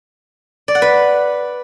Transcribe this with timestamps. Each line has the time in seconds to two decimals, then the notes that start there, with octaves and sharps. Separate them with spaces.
0.68 D5
0.75 F#5
0.82 B4